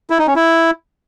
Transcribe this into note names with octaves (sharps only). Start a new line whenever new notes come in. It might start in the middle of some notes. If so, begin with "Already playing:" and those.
E4
D#4
C#4
E4